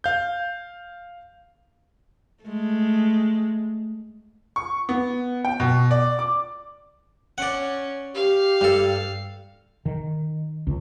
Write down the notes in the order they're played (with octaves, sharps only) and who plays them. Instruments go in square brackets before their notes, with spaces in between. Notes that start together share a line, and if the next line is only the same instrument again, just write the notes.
[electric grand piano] F5 G6
[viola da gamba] G#3 A3
[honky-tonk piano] C#6
B3
G5
B2
D5
D6
[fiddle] C#4 [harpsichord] D5 F#5
[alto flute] G4 [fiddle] F5
[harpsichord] G2 A4
[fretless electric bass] D#3
C#2